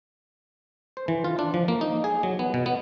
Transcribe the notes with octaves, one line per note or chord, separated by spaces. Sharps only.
C5
E3
F4
D4
F3
A#3
D#4
G#4
F#3
B3
B2
B3